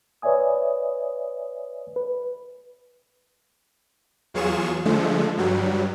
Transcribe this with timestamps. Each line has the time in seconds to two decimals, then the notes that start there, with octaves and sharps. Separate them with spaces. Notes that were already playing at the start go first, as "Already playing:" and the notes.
0.22 B4 C#5 D5 E5 G#5 D#6
1.96 B4
4.34 E2 F#3 F4 G#4 C#6 E7
4.85 D3 F3 G#3 A3
5.37 G2 F#3 G3